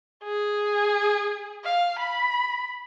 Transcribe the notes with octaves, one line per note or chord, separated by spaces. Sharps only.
G#4
F5
B5